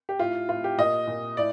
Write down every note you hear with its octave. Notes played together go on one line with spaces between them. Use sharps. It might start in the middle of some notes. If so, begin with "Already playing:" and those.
G4
A2 F4
A2 F4
G4
A#2 D#5
A#2
A2 D5